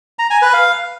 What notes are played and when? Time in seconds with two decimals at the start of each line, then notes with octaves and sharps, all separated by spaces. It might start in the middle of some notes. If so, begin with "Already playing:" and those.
0.19 A#5
0.30 G#5
0.42 B4
0.53 F5